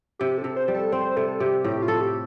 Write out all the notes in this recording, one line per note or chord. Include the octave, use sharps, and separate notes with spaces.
C3 G4
A4
C3
C5
G3
A4
C4 C5
C3 A4
C3 G4
A2 G4
F4
A4
G4